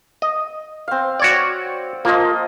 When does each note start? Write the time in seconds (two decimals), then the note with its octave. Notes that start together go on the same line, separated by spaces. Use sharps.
0.22 D#5
0.88 C4 F5
1.20 F#4 C#5 D5
2.05 F3 A#3 F4 D#5